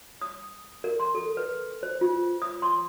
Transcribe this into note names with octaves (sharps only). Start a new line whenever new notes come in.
D#6
A#4
C6
A4
B4
C5
F4
D#6
C6